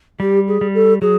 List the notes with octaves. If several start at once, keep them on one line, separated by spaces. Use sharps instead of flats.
G3 G4
G#4
G3
A4
F#3 G#4